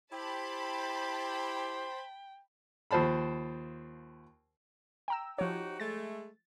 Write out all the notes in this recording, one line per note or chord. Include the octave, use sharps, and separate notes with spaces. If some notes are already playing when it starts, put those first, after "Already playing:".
E4 G4 C5 G5 A5 B5
D#2 F3 C5 A5 B5
G5 A#5 E6
F3 D#4 F#4 G4 C#5
G#3 A3 A6